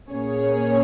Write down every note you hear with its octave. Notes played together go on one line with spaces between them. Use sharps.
A#2 A#3 C#4 G#4 C#5